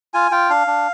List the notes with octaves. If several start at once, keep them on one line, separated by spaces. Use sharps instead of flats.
F4 G#5
F4 G5
D4 F5
D4